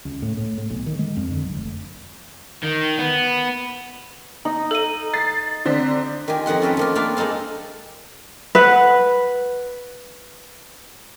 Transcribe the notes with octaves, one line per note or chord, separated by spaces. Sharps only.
C#2
A2
A2
A2
B1
D#3
G#3
F2
D3
B1
F1
D#3
B3
D#4
A4 D#7
A6 C7
D3 C4 B6
D#3 F4 G4 G#5
F2 D#3 F#5 C6
C#4 F4 F#4 A4 B4 G5
F3 A#3 F4
A#3 C4 D4 E4 A#4 F5
G#3 A#3 D#4 A4 F5
B4 F#5